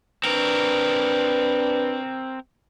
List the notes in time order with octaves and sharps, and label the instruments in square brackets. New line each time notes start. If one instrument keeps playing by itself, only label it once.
[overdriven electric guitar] C4 A#4 [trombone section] D4 B4